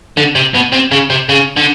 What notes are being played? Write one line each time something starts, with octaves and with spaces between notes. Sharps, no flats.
D3
C3
B2
C3
C#3
C3
C#3
D3